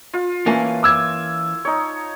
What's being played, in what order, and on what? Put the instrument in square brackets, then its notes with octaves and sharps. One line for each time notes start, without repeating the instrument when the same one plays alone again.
[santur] F4
[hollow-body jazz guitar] E3 A#3 C#4 [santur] A5
[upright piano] D6 E6 G#6
[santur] D#4 C#5